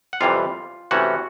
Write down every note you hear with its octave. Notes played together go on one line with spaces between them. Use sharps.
F#5
F2 C3 E3 G3 F4 F5
C3 E3 A3 C#4 F#4 F#5